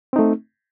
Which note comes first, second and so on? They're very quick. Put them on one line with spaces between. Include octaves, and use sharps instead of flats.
C4 D#4 A3